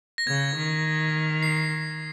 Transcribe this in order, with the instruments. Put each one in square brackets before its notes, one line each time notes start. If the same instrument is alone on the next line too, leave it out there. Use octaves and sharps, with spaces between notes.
[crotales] A#6
[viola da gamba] C#3 [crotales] G#6
[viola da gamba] D#3
[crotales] C7